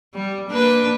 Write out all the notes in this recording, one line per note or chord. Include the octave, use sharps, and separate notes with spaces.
G3
A#3 D4 B4